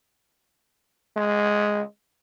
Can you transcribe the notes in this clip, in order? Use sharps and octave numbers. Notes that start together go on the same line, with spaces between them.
G#3